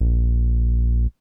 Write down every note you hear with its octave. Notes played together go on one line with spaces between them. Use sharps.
A#1